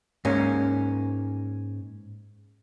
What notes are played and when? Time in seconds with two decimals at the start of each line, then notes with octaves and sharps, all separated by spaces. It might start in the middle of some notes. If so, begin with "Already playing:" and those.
0.25 G#2 A#3 C#4